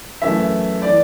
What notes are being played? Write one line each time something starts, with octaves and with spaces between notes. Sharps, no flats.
F#2 E3 A3 E5
E3 D5